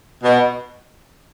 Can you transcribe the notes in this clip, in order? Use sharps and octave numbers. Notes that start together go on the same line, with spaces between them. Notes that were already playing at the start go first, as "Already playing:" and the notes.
B2